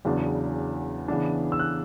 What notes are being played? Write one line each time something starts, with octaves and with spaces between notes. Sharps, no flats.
E2 C#3 F#3 B3 D4
C#3 E3 B3 D4
E6
F#6